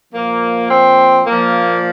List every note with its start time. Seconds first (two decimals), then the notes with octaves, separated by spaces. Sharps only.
0.13 A#2 F3 A#3
0.69 C4
1.26 A#2 F3 A#3